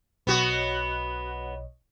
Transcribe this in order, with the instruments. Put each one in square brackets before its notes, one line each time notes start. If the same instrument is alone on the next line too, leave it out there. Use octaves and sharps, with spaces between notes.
[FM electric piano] B1 C#5 D#5 [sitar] B3 F#4